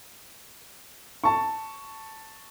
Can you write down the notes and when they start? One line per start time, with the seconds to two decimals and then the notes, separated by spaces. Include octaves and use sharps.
1.24 A5 C#6